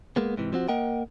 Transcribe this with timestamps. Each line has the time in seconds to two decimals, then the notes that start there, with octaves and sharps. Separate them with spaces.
0.16 G#3 A#3 B3
0.37 G#2 C3 E3
0.53 F3 C4 F#4
0.69 A#3 A#4 D#5 F#5 G5